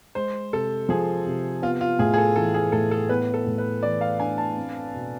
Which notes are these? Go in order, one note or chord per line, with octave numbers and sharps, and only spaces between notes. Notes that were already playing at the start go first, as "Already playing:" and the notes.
G#3 C5
C3 A4
F3 G#4
C3
B3 F4
F4
A2 G#4
G#4
A4
E3 A4
G#4
A2 A4
A4
B3 B4
A4
A2
B4
E3 D5
F5
D4 G#5
A5
C4
B2